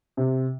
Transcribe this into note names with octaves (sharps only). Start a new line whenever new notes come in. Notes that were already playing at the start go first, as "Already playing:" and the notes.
C3